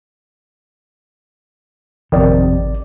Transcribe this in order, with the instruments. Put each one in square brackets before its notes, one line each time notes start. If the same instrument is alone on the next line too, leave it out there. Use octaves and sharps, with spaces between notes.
[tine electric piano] G#1 D5 [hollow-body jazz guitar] F2 C3 [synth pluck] D#3